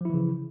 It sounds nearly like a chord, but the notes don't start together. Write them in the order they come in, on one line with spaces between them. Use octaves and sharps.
F3 E4 E3 C#3